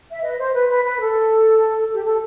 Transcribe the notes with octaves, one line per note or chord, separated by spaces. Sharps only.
E5
B4 D#5
C5
B4
B4
B4
A4
G4
A4